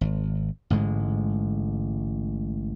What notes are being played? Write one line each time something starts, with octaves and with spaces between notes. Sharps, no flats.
G#1
A1 G#2 D3 G#3